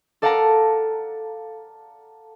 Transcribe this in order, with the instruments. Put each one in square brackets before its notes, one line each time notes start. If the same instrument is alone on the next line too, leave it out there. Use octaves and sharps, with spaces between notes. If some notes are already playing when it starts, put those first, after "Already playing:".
[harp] A4 D5 F5 F#5 A5 A#5